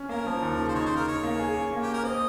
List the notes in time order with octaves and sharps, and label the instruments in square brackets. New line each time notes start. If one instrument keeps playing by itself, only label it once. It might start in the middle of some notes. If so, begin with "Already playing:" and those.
Already playing: [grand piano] C#4
[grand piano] A#3 [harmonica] A#4
[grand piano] F3
D#2
C#3
[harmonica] C5
[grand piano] D#4 [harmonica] C#5
[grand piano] C#3 [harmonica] C5
[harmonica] A#4
[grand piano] D#4 [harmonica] C#5
[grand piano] A#3
G#4
C#4
A#3
[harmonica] G4
[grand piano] A#3
[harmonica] A#4
[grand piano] C4 [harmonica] D#5